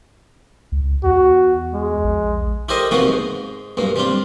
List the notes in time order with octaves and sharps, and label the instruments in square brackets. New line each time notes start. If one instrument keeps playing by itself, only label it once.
[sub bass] C#2
[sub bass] E2 [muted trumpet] F#4
[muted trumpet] G#3
[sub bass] A#1
[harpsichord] E4 G4 A4 A#4 C5 D#5
C3 D#3 F3 A#3 B3 F#4
G#2
B1 G2 A#3
G3 C4 D4 F4